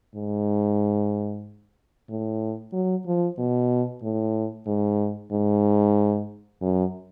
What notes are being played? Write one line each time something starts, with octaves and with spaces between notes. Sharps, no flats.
G#2
A2
F#3
F3
B2
A2
G#2
G#2
F#2